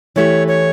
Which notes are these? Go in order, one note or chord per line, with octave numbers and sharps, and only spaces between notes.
E3 A3 E4 G4 C#5
C#5